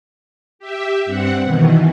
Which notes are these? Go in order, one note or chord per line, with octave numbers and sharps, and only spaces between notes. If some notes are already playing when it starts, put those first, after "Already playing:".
G4 E5
G2 C4 F#5
B2 D#3 E3